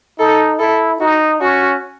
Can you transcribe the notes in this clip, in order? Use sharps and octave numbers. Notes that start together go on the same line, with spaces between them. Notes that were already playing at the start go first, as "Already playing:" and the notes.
D#4 A4
E4 A4
D#4 F#4
C#4 F#4